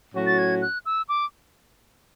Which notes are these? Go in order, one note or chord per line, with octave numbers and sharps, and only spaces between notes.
A2 F#3 C#4 F#4
A6
G#6
F#6
E6
D6